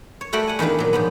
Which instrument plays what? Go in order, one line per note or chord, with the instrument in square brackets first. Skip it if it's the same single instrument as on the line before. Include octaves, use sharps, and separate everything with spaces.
[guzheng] C#5
G3 A3 F#4 A4 F#5 G5
F#5 G#5
E2 D#3 A#3 D4 B4
A#2 F#3
G#2 F3 B3